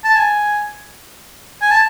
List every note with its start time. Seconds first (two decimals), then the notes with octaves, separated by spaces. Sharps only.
0.04 A5
0.16 G#5
1.62 G#5
1.71 A5